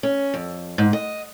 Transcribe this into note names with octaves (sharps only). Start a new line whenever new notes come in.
C#4
F2
G#2
D#5